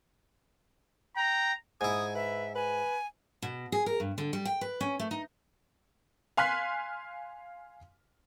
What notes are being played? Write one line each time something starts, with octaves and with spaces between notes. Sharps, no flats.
G5 A#5
G#2 E4 G#5 D#6
B4 E5
B4 G#5
B2
G#4
A#4
G2
D3
G3
G5
B4
C#4
A3
D#4
F5 G#5 C6 F6 F#6 B6